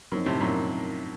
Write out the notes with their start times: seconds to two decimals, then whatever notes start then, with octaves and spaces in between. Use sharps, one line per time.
0.12 F#2 F3 C4 D#4
0.26 A2 C3
0.40 F#2 A#2